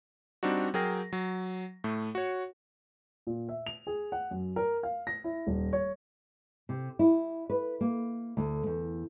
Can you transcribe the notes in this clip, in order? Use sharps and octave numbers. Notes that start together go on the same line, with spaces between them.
G3 C4 D4 D#4 F#4
F#3 G#4 A#4 G5 A#6
F#3
A2 A3
F#4 C#5
A#2
E5
F7
G#4
F#5
F#2
A#4
F5
A#6
E4
D#1
C#5
C3
E4
B4
A#3
D2
E2